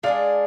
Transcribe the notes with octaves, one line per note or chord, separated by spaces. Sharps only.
G#3 D4 G#4 D5 F5